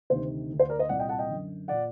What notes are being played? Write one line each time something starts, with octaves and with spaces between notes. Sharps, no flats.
D2 C3 D#3 C5
D2 D3
C5
A#4 D5
C5 D#5
C2 A#2 D5 F#5
D#5 G5
F#5 A5
D#5 G5
F#2 D3
A#2 D5 F#5